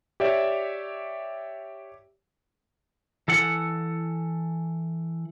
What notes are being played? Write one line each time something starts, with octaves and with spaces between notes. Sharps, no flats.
G4 C#5 D5 E5
E3 A4 F#5